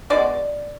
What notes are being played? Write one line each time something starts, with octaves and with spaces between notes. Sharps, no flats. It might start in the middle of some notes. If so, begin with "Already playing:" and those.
B2 G#3 D5